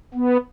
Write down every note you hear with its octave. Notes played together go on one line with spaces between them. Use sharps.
B3